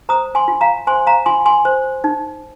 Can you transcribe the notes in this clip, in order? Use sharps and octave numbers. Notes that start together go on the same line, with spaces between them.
C5 A#5 D#6
G#5 C6
F4
F5 A#5
C5 G#5 C6
F5 A#5
F4 G#5 C6
G#5 C6
C5
D#4